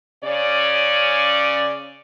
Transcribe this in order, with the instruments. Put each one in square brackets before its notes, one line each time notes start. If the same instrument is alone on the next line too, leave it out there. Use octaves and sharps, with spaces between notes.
[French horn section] C#3 C#4 D5